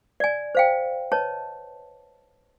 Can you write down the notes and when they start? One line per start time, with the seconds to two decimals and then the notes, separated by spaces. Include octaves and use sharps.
0.20 D5 G#5
0.55 C5 F5 G5
1.12 B4 C#5 D#5 A5